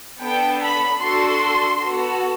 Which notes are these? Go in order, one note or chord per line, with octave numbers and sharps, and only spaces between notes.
B3 D4 A4 G5
B5
D4 F#4 A4 C6
B3 F#4 A4